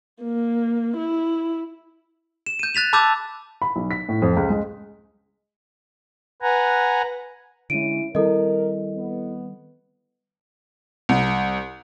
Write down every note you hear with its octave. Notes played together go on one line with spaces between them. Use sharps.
A#3
E4
E7
G6 D#7
F#6 A6 B6 F7
A5 B5 D6 E6 G6 A6
B5
B1
B6
A2
F2
C#2
G#3
B4 F#5 G#5 A#5
D3 G#3 C#4 E4 D7 D#7
D#3 G3 C4 E4 A4 A#4 D#5
B3
C2